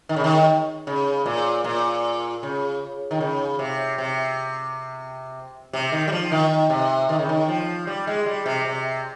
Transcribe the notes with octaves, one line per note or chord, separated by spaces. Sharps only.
D#3
C#3
D#3
C#3
A#2
A#2
C#3
D#3
C#3
C3
C3
C3
D#3
G3
F3
D#3
C3
D#3
C#3
D#3
F3
G3
G#3
G3
C3
C3